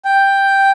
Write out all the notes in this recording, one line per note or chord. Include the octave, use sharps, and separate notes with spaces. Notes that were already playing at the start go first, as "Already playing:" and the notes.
G5